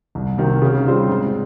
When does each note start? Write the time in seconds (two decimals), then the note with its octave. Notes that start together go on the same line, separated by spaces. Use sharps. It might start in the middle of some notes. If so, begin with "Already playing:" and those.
0.15 C2
0.38 C3 D#3
0.62 C#3
0.86 G3 C4 F4 C5
1.09 G#2